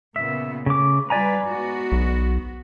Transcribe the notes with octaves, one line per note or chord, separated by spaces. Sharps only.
A#2 C#3 B3 E5
C#3 A3 D6
G3 F4 B4 D5 G#5 A#5
G#2 B3 F#4
B1